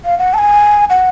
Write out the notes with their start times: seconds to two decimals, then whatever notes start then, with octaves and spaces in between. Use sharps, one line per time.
0.05 F5
0.19 F#5
0.34 A5
0.38 G#5
0.90 F#5